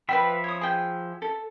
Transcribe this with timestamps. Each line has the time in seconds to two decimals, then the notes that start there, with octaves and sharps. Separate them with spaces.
0.09 F3 B4 D5 E5 G5 B5
0.44 C#5 D#6
0.61 G#4 G5
1.22 A4